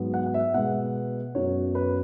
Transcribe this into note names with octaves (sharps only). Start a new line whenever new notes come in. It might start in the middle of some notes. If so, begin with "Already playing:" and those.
Already playing: G#2 F#3 B3
F#5
F#5
E5
B2 G#3 B3 F#5
F#2 F#3 B3 C#5
B4